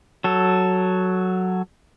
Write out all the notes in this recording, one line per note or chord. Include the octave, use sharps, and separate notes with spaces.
F#3 A4